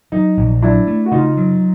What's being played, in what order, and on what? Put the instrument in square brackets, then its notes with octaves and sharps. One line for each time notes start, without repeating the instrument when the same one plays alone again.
[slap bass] F#3 [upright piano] D#4
[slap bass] A#1
[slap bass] F#3 [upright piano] D4 E4
[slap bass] A3
[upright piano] F#4
[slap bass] C#3 [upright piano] D#4 F4
[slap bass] F#3